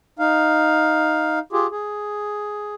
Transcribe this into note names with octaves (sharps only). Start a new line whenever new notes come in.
D#4 F5
F4 G4 G#4
G#4